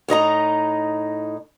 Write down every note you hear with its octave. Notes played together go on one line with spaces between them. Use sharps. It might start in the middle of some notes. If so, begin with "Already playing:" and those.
A2 D#4 D#5 A#5